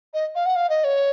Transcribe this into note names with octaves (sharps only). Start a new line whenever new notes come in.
D#5
F5
F#5
F5
D#5
C#5